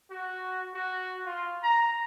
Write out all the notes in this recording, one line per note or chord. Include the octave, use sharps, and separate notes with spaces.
F#4
F#4
F4
A#5